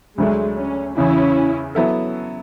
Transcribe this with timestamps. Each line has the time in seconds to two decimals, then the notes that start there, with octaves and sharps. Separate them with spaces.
0.18 D2 D3 F#3 G#3 A3 D4
0.57 C#4
0.96 E2 C#3 E3 C#4 E4
1.75 F#3 B3 E4 A4